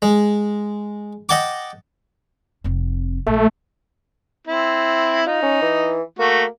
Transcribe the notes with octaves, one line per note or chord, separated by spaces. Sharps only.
G#3
D#5 F#5 G5 A5 D6
F1 C4
A#1 A3
C4 E4
D#4 F4
C#4
E3
A3 A#3 F#4